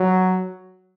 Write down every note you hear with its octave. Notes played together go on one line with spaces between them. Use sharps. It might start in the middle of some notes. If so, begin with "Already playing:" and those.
Already playing: F#3